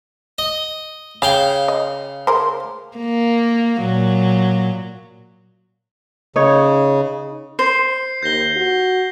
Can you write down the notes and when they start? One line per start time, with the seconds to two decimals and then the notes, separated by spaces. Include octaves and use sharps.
0.38 D#5
1.22 C#3 G#4 F5 G5
1.68 D#5
2.27 G#4 A#4 C5
2.98 A#3
3.81 A#2 F#3
6.36 C#3 D#4 C#5
7.59 C5 C7
8.23 D#2 G6 A#6 G7
8.57 F#4